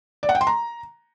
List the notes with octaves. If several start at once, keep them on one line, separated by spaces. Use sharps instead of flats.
D5
F#5
G5
C6
A#5